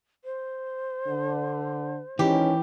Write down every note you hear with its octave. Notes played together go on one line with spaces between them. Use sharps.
C5
D3
G#2 D#3 E3 C#4 G4